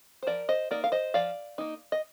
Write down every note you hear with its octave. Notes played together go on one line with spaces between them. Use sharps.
C5
F3 A#4 D5
C5 D#5
A#3 D#4 A#4 D5
F5
C5 D#5
F3 D5 F5
A#3 D#4
D#5